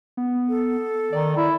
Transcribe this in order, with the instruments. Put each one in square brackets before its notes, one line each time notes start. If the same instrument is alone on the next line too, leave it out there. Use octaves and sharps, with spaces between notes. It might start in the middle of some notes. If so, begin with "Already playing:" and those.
[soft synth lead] B3
[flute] A4
[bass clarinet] D#3 [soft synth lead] D5
[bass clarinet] E4